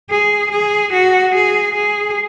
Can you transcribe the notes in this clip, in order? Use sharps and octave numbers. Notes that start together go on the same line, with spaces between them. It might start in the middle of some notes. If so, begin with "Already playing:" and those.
G#4
G#4
F#4
G#4
G#4